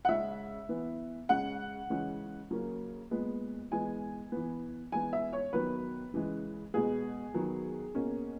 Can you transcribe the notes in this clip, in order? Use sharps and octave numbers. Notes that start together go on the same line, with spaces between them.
F#5
C#3 G#3 C#4 E5
E3 B3
C#3 G#3 C#4 F#5
C#3 E3 G#3 C#4
C#3 F#3 A#3 C#4
A#2 G#3 B3
E3 G#3 B3 G#5
E3 B3
E3 G#3 B3 G#5
E5
C#5
D#3 F#3 B3 B4
C#3 E3 G#3
B2 G#3 B3 G#4
D#3 F#3 B3
B2 A#3 C#4